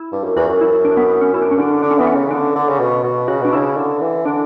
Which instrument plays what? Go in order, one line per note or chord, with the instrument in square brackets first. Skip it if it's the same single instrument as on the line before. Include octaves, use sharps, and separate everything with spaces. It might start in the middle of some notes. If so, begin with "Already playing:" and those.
Already playing: [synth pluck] E4
[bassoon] G2
F#2
[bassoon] E2 [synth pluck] F#4
[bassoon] F#2
[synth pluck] E4
D4
B3
B3
C#4
[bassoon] F#2 [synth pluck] E4
[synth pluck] D4
C#4
[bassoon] D3 [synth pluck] D4
[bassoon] D3 [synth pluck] D4
[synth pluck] C#4
[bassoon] E3 [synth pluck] B3
[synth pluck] C#4
[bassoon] C#3
[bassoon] D3 [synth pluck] D4
[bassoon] D3
C#3
B2
B2
[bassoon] C#3 [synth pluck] F#4
[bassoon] B2 [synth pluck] D4
[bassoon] C#3 [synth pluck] E4
[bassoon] D3
E3
[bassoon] D3 [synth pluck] D4